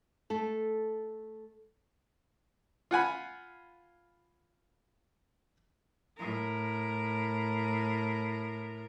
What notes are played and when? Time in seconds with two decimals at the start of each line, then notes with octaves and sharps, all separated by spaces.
0.30 A3 A4
2.91 F4 F#5 G#5 B5
6.18 A2 A#4